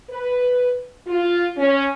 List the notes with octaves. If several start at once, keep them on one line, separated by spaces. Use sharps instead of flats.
B4
F4
C#4